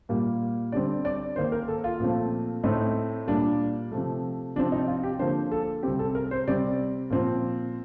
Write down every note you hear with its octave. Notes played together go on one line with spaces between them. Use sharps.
A#2 G3 A#3
D3 G3 C4 D5
D5
D#3 A#3 C5
A#4
A4
F4
A#2 F3 A3 C4
A2 A3 C4 D#4
A#2 G3 A#3 D4
C3 F3 A3
C3 F3 C4 D4
D#4
F4
G4
D3 F3 A#3 C5
A4
C3 G3 C4 G4
A4
A#4
C5
C3 G3 C4 D5
A#2 F3 C4